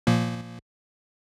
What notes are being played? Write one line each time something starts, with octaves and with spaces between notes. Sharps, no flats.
A#2 F3 A#3